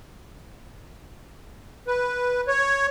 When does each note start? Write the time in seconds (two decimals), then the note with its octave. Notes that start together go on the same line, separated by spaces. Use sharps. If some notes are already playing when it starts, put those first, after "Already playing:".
1.87 B4
2.48 C#5